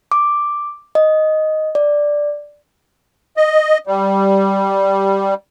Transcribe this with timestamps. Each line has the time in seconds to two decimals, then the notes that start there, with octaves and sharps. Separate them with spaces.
0.12 D6
0.95 D#5
1.75 D5
3.37 D#5
3.87 G3